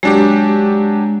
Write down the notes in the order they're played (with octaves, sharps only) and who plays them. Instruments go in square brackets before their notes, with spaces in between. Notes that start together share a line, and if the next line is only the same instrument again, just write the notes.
[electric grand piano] F#3 D4 G4 [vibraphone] G#3